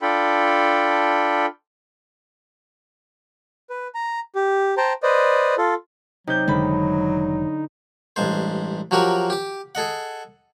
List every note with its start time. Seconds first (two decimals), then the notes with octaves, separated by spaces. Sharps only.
0.02 D4 F4 A4 G5 B5
3.70 B4
3.95 A#5
4.35 G4
4.77 C5 G5 A5 A#5
5.03 B4 C5 D5 D#5
5.58 F4 A4
6.27 C3 F#3 D#4 G6
6.48 F1 D3 D#3 G#3 B5
8.16 A1 G2 G#3 C5
8.91 F3 F#3 F#4 G4 A#4
9.30 G4 D6
9.75 G#4 A4 D#5 F#5